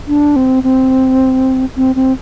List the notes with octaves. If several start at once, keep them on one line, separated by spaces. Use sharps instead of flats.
D4
C4
C4
C4
C4